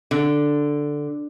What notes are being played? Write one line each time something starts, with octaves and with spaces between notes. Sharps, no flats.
D3